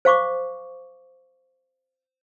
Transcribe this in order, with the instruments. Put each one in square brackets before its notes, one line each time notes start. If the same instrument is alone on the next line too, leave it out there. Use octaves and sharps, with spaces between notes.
[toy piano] C5 F5 C#6 D6